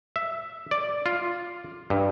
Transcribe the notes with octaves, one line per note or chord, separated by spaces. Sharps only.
E5
D5
F4
G2